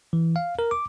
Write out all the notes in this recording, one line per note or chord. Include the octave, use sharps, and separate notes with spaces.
E3
F5
A#4
D6